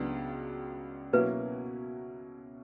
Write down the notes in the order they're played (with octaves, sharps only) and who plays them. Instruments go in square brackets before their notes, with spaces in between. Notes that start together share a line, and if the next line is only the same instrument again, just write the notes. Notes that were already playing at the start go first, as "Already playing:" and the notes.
Already playing: [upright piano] C#2 C#3 F#3 B3 D4
[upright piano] B2 F#3 A#3 C#4 E4 [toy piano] B4